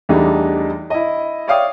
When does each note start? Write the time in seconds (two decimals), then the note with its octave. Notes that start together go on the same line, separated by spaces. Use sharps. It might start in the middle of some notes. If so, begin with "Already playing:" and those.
0.09 E2 E3 G3 A3 D4 D#4
0.90 E4 D#5
1.48 C#5 D5 E5 F5 G5 D#6